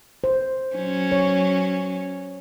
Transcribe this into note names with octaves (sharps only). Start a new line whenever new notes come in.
C5
F#3 C#4
C#5